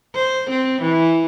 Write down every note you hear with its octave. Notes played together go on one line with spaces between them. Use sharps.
C5
C4
E3